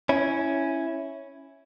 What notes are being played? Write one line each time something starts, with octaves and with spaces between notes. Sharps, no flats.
C#4 E4